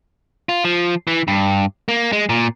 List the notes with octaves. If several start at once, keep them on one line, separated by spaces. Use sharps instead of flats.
F4
F3
E3
G2
A#3
G#3
A#2